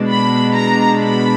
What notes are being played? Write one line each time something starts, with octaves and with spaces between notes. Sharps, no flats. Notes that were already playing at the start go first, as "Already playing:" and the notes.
Already playing: B2 G#3 D4
B5
A#5
B5